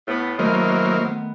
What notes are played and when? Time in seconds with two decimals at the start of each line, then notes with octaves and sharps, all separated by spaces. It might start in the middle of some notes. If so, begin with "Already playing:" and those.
0.08 A2 B3
0.39 D#3 F#3 A3 A#3 E4 C5 D#5
1.05 B3